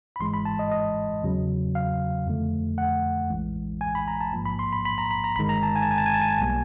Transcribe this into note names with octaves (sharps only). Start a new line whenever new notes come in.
B5
G#1 G#2 E3 G#3 C6
B5
A5
D#5
D#5
E2 C#3 F#3
F5
F2 D3 F3 A3
F#5
A#1 A2 E3 G#3
G#5
B5
A#5
A5
A1 G#2 F3 A#3
B5
C6
B5
B5
A#5
B5
A#5
G1 G2 D#3 G#3 B5
A#5
A5
G#5
A5
G#5
A5
G#5
A5
G#5
A5
B1 B2 G3 A#3 G#5